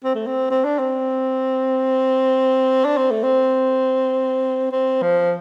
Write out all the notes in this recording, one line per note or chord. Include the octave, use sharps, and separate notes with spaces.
C4
A3
C4
C4
D4
C4
D4
C4
A3
C4
C4
F3